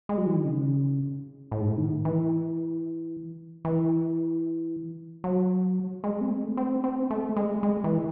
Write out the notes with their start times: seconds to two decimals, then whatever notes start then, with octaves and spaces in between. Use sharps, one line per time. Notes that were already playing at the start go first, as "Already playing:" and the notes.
0.09 G#3
0.18 F#3
0.27 E3
0.35 D#3
0.45 C#3
1.51 A2
1.60 G#2
1.69 A2
1.78 D#3
2.05 E3
3.65 E3
5.24 F#3
6.04 G#3
6.21 C4
6.30 A3
6.57 C4
6.84 C4
7.10 A3
7.36 G#3
7.63 G#3
7.84 E3